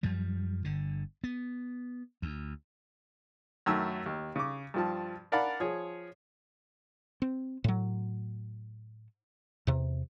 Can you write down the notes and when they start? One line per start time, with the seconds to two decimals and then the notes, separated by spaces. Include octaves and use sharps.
0.03 F#2 F3 G3
0.64 G1 D3
1.24 B3
2.22 D2
3.66 F#2 D#3 A3 E6
4.06 D#2
4.36 C#3 D6
4.74 G2 F3 A5
5.32 A#4 D5 F5 F#5 A5 B5
5.60 F3 G#4 C#5
7.22 C4
7.64 A2 F#3
9.67 E2 C3